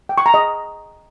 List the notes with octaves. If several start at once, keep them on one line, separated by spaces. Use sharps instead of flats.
G5
C#6
A#5
D#5